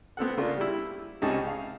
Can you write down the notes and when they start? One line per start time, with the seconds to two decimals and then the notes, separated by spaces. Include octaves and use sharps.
0.17 B3 C4 A4 F#5
0.37 C#3 A#3 D4 F4
0.57 G3 E4
1.22 C#2 C3 C#4 D#4 G#4 A5
1.47 F5